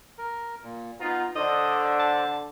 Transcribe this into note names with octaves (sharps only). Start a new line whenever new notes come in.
A#4
A#2
B3 D#4 F4 A#5
D3 C5 D5 D#5
A5